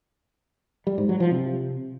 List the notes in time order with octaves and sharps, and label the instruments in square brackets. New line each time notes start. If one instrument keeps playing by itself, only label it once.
[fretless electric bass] G3
G#2
F#3
F3
C3